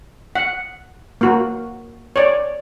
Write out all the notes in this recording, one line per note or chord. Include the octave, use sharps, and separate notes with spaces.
F#5
A#3 F#4
C#5 D5